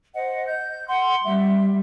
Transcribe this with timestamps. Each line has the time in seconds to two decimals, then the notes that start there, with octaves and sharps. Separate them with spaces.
0.15 C5 D#5 F#5
0.48 G6
0.88 F#5 C6
1.23 G3 E5